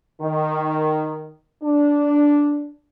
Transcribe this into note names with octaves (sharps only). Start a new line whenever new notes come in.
D#3
D4